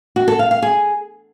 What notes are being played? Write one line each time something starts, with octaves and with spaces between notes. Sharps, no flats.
F#4
A4
F5
F5
G#4